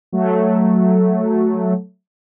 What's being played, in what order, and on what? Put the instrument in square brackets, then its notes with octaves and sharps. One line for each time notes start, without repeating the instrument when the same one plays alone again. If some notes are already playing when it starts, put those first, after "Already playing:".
[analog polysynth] F#3 A3